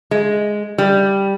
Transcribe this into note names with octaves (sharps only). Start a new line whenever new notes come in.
G#3
G3